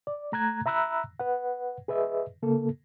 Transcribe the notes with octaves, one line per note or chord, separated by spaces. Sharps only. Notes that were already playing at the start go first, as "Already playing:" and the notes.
D5
A3 A#5 F#6 G#6
E5 A#5 B5 E6 F#6
B4 F#5
G#4 B4 D#5 E5
C#3 A#3 A4